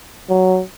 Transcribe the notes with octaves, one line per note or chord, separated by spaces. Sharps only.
F#3